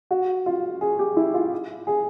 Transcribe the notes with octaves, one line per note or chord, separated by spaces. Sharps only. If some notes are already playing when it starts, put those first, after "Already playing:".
F#4
F4
G#4
G4
E4
F4
G#4